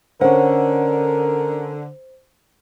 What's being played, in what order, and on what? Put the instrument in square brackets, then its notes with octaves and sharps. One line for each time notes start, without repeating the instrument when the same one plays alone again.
[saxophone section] D3 [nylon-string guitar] C#4 F#5 [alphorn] A#4 [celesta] C5